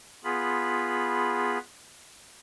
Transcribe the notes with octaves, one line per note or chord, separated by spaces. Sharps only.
B3 F4 G#4 B5